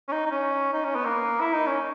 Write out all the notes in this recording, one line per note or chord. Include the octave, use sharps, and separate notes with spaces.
C#4
D#4
D#4
C#4
D#4
C#4
B3
A#3
E4
D#4
C#4